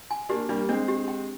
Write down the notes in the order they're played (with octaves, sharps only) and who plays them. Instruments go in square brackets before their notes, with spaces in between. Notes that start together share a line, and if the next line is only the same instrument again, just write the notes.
[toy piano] G#5
[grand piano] A#3 D4 [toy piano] G4
[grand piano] G3 A#3 [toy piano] D4
[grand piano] G#3 C4 [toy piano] D4
[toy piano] G4
G5